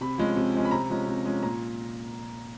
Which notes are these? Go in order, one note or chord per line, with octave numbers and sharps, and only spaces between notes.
C3 B5
F3 G#3 C#4
C3
F3 G#3 C#4
B5
C3 A#5
F3 G#3 C#4
C3
F3 G#3 C#4
A#2 A#5